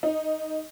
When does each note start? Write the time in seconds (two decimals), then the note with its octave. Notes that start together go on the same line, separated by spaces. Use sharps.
0.03 D#4